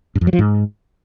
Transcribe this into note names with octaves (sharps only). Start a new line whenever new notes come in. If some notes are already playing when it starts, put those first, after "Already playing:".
G2
F2
F#3
F3
G#2